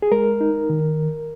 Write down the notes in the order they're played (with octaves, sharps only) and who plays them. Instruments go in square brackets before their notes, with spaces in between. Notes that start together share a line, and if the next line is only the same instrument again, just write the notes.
[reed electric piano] G#4
G#3 A#4
D#4
D#3